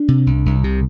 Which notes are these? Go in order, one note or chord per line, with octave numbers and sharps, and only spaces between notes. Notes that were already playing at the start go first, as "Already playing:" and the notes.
Already playing: D4
C3
C2
C2
C3